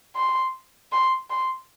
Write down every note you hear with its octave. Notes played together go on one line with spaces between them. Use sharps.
C6
C6
C6